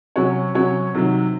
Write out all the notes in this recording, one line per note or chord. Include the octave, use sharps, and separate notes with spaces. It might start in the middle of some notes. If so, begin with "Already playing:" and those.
C3 F#3 C#4 F#4 C#5
C3 F#3 C#4 F#4 C#5
C3 D#3 F#3